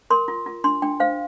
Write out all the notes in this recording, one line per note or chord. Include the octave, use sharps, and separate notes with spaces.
A#4 C6
F4
F4
D4 C6
D4 G5
C5 F5